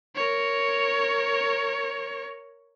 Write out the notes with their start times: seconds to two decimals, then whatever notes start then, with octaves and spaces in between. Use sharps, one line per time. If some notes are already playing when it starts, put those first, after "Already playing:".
0.15 A#4 C#5